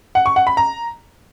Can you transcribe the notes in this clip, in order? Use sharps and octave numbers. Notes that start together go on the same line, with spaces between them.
F#5
C#6
F#5
B5
A#5